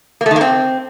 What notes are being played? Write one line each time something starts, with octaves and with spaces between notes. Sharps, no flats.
A#3
A3
D#3
A#3
C4